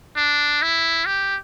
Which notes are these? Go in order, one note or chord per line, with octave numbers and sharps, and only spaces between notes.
D4
E4
G4